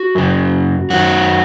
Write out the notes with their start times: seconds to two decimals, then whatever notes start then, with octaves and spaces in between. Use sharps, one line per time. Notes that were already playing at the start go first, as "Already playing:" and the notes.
Already playing: F#4
0.15 F#2 C#3
0.90 F#2 D#3 F#4